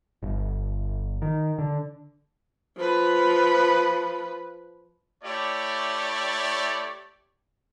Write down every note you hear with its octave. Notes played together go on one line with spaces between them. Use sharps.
G1
D#3
D3
F3 B4
A3 E4 G4 C#5 D5